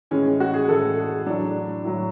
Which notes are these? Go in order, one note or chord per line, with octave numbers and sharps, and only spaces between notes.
A2 E3 G#3 C#4
F#4
G#4
A2 E3 G#3 A4
G#4
A2 F#3 D4
A2 F#3